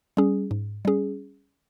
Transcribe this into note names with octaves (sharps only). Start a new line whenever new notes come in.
G3 C#4 G#4
G#2
G3 C#4 G#4